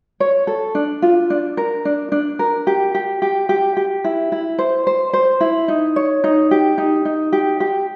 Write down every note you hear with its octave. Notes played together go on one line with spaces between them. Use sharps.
C#5
A4
D4
F4
D4
A#4
D4
D4
A#4
G4
G4
G4
G4
G4
E4
E4
C5
C5
C5
E4
D#4
C#5
D#4
G4
D#4
D#4
G4
G4